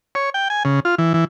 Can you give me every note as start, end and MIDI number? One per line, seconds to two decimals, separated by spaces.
0.15 0.30 73
0.34 0.48 79
0.50 0.63 80
0.65 0.80 49
0.85 0.95 65
0.98 1.14 52
1.14 1.25 52